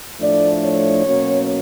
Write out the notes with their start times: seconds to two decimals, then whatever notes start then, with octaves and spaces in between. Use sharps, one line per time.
0.20 A2 F3 A3 D4 D5
0.63 C#5
1.05 B2 F#3 A#3 C#4